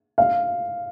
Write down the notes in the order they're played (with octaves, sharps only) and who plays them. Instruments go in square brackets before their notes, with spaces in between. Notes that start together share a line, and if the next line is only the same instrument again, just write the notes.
[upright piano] F5